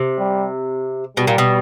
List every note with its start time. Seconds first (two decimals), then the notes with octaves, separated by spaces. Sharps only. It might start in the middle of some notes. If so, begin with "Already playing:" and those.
Already playing: C3
0.18 G3
1.17 B2 G3
1.27 A#2
1.38 B2